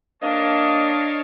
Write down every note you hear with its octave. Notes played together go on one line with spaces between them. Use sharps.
A#3 D4 C#5 D#5 F5 A5